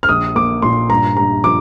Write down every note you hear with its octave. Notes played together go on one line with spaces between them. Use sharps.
F6
A#1 D#6
A#3 D6
A#2 C6
G2 A#5
G2 A#5
F3 D6